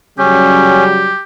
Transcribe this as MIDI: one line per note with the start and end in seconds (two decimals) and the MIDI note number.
0.19 1.14 49
0.19 1.14 54
0.19 1.14 55
0.19 0.84 61
0.19 1.23 67